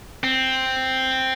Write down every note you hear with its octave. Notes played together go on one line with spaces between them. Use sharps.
C4